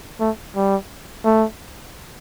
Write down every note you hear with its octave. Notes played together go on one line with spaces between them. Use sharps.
A3
G3
A3